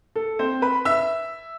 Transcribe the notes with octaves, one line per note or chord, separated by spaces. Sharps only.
A4
C4 C5
B4 B5
E5 E6